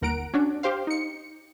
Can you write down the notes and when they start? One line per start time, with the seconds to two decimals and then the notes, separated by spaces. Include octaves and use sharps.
0.01 G1 D#2 A#4 F#5 A#5 D7
0.34 C#4 D4 F#4
0.63 G4 C5 F5
0.87 D#4 C#7